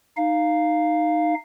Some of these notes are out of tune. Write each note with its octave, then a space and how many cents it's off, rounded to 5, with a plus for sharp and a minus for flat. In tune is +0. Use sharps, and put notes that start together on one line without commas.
D#4 -10 F5 +0